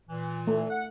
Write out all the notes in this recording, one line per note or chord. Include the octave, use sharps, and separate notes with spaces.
A#2 E3
A3
F#5